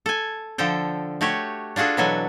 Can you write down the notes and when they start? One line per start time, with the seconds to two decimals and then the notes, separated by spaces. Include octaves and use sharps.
0.06 A4 G#5
0.58 D3 F3 A4 G5
1.21 A3 F#4 G4 C#5
1.76 D4 F4 F#4 G#4 A4
1.97 B2 E3 F#3 F#4 A4 G#5